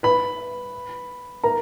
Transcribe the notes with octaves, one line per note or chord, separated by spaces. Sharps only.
B4 B5
A#4 A#5